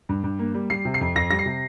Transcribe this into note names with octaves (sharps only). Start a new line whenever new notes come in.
G2
G2
A#3
G3
G3 C7
C3
C7
F2
F2 A#6
G3 A#6
C7
C3